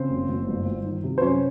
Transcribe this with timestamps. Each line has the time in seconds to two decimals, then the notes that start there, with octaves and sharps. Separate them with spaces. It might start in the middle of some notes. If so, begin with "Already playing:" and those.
Already playing: C#3 C4 C5
0.10 F#1
0.28 F#1
0.48 G1
0.65 G1
0.84 D#3
1.04 C3
1.18 C5
1.21 F#2 C#4 C#5